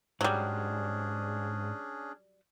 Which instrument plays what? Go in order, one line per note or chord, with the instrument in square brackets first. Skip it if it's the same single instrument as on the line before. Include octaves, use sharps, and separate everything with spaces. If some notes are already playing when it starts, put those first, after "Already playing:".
[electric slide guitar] G#2 [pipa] F#3 G3 [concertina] C#4 D4 G#4